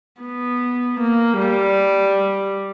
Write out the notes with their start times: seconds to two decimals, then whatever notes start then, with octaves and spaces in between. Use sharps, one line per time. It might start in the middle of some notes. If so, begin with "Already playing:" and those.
0.21 B3
1.00 A#3
1.38 G3